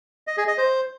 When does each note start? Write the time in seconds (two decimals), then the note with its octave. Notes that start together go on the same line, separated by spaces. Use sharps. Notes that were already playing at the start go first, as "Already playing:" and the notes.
0.27 D#5
0.37 G#4
0.48 D#5
0.58 C5